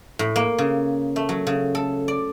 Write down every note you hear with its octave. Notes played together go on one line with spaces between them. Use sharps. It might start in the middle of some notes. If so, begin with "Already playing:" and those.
A2
A#3
C#3
A3
F#3
C#3
A4
D5